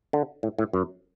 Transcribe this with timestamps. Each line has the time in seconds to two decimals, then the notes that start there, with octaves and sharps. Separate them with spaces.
0.13 D3
0.43 A2
0.59 A2
0.73 F#2